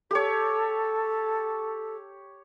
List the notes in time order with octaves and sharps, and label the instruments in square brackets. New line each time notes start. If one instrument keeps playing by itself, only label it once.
[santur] G4 C#5 [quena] A4